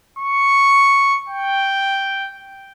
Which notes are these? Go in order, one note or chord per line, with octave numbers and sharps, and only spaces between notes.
C#6
G5